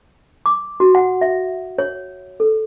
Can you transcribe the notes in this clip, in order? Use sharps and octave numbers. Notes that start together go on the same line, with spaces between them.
D6
F#4
F#5
E5
C#5
A4